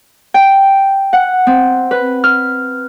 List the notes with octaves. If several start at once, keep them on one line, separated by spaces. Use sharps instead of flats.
G5
F#5
C4
B4
F6